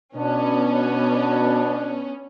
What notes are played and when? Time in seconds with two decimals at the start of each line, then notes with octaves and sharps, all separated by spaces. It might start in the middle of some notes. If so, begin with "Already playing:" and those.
0.15 B2 B3 C#4 D4